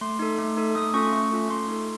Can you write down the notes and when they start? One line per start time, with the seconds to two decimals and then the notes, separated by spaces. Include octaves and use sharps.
0.01 A3 C6
0.19 D#4 A4
0.39 A3
0.57 D#4 A4
0.75 A3 D#6
0.94 C#4 F4 A4 C#6
1.13 A3 C#6
1.31 C#4 F4 A4
1.49 A3 C6
1.68 D#4 A4